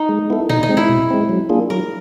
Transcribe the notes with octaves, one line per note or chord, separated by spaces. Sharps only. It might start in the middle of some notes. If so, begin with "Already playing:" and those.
Already playing: D#4
G#3
B3 E4 A4
B2 D#4
D#4
G#3 C4
E4
B2
G#3 C4
F#3
A#3 D4 F4 G#4
F#3 A#4